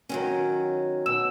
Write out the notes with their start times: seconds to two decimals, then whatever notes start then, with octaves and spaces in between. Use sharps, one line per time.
0.09 D#3 F#3 C#4
1.06 B2 E6